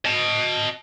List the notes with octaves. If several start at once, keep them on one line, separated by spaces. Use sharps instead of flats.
D#5 A5